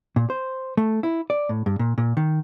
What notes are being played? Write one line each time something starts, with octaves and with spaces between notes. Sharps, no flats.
A#2
C5
A3
E4
D5
A2
G2
A#2
A#2
D#3